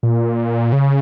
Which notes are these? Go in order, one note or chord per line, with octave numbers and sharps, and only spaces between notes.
A#2
C#3